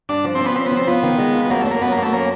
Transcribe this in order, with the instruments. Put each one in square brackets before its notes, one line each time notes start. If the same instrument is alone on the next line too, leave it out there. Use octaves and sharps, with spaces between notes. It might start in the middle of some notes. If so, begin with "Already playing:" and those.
[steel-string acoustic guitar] G2 [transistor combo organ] D4
[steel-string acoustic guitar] F3
[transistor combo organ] C4
[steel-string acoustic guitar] C#4
[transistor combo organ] B3
[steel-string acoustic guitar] F3 [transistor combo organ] C4
[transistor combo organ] B3
[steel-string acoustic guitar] F3
[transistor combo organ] C4
[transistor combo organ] B3 [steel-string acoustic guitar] F4
[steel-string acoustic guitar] D#3
G#3
F4
[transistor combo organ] B3
[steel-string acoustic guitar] F#2 [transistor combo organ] A#3
[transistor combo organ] A3
[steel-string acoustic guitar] F#2
[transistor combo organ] A#3
[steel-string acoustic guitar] F#2 [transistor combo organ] B3
[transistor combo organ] A#3
[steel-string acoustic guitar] F#2
[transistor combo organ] A3
[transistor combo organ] A#3 [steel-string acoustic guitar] C#4